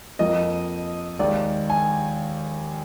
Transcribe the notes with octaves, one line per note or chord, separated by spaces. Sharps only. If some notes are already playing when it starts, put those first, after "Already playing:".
F2 F3 A#3 D#5
D#2 D#3 G#3 D5
G#5